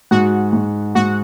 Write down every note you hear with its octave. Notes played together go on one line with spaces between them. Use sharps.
G#2 F#4 F#5
G#2
G#2 F#4 F#5